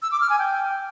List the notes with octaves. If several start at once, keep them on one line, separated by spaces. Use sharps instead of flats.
E6
D6
F6
G#5
G5